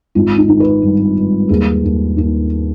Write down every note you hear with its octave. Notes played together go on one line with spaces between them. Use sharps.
G#1 F4
D#4
D#3
B4
G2
G2
D#2 G#4
D#2
D#2